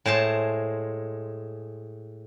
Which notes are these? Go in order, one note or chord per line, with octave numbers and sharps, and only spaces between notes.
A2 G#3 C5 A5